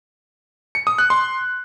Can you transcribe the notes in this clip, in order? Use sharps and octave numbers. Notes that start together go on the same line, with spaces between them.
C#7
D#6
F#6
C6